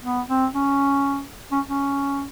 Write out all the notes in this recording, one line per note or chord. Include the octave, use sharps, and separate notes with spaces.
B3
C4
C#4
C#4
C#4